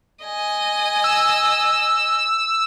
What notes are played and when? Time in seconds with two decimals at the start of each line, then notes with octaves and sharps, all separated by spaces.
0.25 D#5 G#5
1.04 E6